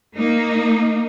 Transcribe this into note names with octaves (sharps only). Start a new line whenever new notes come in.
A#3 D#4